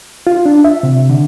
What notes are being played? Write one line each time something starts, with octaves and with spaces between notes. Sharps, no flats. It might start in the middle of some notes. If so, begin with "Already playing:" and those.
F4
D4
E5
C3
D3